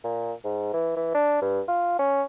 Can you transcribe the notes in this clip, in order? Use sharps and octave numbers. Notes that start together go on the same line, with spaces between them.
A#2
G#2
E3
E3
D4
G2
F4
C#4